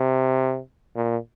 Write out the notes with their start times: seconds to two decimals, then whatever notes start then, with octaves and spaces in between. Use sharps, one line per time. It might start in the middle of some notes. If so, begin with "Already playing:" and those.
Already playing: C3
0.96 A#2